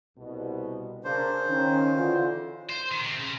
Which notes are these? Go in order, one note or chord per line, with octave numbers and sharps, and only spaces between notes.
C2 B2
C#3 D4 A#4 C5
D#3 C#4
D3 E3 F4
C5
D#3
C3 C4
C#3